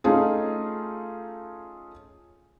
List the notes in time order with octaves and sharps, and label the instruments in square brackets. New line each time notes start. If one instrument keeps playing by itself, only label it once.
[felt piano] A3 C#4 D#4 F4 G#4